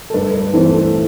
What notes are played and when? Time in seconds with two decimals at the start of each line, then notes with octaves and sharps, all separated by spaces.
0.10 A4
0.14 G2 B4
0.34 B4
0.54 E3 A3 C4 E4 A4
0.73 A4